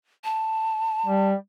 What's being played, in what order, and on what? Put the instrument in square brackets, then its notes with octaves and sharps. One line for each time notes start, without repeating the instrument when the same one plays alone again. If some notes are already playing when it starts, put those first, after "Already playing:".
[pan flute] A5
[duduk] G3